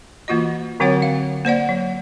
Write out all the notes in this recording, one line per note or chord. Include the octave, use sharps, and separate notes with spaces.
E3 A#3 F4 F#4 D#5
D3 F#3 C4 F#4 C#5 F#5
F5
A#3 C5 D5 F#5
F#3